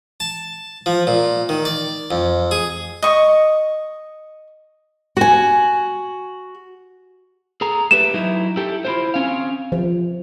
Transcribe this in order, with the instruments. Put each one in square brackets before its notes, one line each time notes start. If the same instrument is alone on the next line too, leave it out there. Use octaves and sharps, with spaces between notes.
[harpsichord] A5
F3
A#2
D#3
D5
F2
G#4
[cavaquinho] D#5 C#6
[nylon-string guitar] F#4 G#5
[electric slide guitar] G#4 A4 A#5
[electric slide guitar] A3 G4 B4 [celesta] E7
[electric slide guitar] F#3 D#4 E4
E4 G4 A4
E4 F4 C5
C4 C#4 F5
[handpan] F3